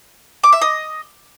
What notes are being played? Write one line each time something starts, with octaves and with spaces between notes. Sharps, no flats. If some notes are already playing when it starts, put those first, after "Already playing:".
D6
E5
D#5